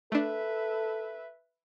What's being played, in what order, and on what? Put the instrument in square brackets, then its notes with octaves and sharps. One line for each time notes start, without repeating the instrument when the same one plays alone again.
[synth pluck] A3 D4 [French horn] A4 [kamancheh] B4 E5